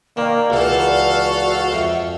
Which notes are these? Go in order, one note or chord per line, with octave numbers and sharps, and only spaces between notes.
D#3 A#3 D5
C#2 E3 F#4 A4 F5
F2 E5